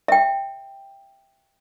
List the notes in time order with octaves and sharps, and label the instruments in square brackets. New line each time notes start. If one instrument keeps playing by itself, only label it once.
[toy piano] E5 G5